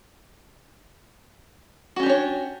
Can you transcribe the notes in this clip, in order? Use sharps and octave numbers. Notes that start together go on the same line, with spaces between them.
C#4 D4 F#4 G4 C#5